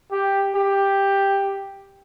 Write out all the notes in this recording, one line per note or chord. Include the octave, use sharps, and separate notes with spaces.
G4
G4